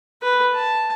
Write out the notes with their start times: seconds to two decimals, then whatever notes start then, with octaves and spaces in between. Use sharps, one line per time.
0.22 B4
0.54 A5